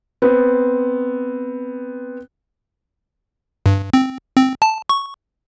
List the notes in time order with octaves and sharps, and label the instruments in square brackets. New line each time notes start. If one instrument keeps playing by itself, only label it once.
[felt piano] B3 C4
[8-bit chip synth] G2
C4
C4
A5
C#6